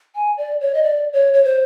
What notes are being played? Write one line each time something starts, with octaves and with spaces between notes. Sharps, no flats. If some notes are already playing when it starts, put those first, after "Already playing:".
G#5
D5
C#5
D#5
D5
C#5
C#5
C5